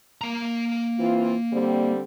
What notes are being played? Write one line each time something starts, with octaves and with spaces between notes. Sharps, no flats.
A#3 A#5
E3 C4 F4
D3 G3 C4